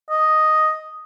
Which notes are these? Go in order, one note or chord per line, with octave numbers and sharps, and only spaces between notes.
D#5